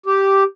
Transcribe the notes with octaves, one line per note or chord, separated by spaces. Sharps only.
G4